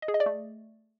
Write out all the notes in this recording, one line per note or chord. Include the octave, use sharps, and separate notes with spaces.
D#5
G#4
D#5
D5
A3